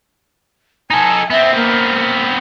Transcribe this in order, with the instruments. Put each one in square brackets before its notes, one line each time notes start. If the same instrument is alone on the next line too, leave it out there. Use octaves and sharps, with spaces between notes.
[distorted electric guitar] D#4 A4 [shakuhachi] G#5
[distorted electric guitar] B3 C4 [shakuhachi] E5
[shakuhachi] A#3